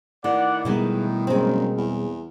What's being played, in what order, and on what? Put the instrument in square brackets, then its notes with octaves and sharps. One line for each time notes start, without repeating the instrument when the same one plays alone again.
[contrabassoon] A2 [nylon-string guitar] D#3 [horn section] D5 F#5
[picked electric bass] B2 G3 B3 [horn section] D#3 [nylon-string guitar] E3 G#3 D#4
[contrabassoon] F#1 [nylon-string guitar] G#3 C4
[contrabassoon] E2